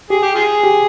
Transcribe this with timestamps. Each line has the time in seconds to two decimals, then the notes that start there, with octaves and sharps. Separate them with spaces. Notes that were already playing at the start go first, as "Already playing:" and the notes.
0.10 G4 G#4
0.23 G4
0.35 F4 G#4
0.63 G4